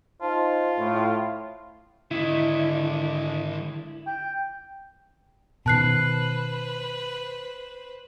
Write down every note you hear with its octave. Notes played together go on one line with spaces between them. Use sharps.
D#4 F4 C5 A5
A2
G#2 D3 D#3 E4
G5
B2 D#3 B4 C5 A5 F#6 C7